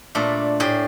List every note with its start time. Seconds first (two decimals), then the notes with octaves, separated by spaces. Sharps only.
0.15 A#2 A3 D4
0.60 A2 G4 G#4 G5